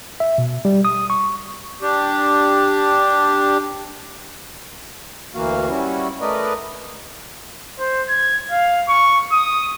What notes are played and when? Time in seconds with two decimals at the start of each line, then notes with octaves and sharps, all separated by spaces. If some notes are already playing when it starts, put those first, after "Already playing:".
0.20 E5
0.38 B2
0.65 G3
0.85 D#6
1.10 C#6
1.82 D4 G4
5.35 D2 E3 A#3 F#4 F5
5.69 G3 C#4 E4 F#4
6.21 A3 A#4 B4 D5 D#5
7.79 C5
8.09 G#6
8.51 F5
8.88 C#6
9.32 D#6